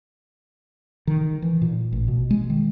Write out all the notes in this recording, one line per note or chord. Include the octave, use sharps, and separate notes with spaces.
D#3
E3
A#2
A1
B2
G#3
D#3